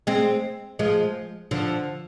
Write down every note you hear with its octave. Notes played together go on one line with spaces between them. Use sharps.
G#3 C4
F3 G#3
D3 F3